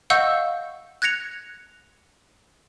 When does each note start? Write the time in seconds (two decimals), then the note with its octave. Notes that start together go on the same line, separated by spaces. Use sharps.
0.10 D#5 F5 F#5 C#6 E6 G6
1.02 F#6 G#6 A#6 C#7 F7